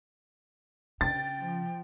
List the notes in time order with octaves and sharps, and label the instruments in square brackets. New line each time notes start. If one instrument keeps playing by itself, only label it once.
[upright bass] C#3 [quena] G5 [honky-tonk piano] A6
[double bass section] F3